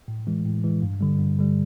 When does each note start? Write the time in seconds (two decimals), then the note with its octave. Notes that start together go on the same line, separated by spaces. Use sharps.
0.08 A2
0.27 E3 G#3
0.45 A2
0.64 E3 G#3
0.82 G2
1.01 D3 G3
1.19 G2
1.38 D3 G3